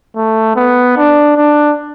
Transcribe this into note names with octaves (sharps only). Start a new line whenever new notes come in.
A3
B3
D4
D4